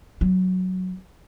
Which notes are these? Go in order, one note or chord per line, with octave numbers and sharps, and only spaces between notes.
F#3